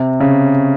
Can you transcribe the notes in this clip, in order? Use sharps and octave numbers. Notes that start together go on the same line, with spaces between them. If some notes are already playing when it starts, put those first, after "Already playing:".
Already playing: C3
C#3